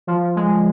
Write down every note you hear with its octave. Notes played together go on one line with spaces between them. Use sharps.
F3
G#3